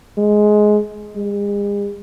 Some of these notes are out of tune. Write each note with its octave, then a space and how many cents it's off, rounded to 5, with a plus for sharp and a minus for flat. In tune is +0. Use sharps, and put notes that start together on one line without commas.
G#3 +10
G#3 -40